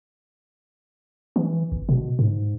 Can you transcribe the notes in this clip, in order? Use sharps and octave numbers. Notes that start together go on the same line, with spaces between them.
E3
G1
B2
G#2